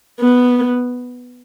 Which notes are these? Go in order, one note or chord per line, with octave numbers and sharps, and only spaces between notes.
B3